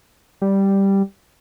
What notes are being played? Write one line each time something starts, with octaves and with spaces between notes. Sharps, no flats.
G3